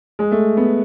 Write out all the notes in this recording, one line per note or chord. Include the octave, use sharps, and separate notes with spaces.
G#3
A3
B3